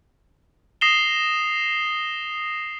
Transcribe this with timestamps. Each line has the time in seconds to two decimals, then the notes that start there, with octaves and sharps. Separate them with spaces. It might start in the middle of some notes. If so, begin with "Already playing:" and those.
0.81 D#6 A#6 C7 E7 F7 G7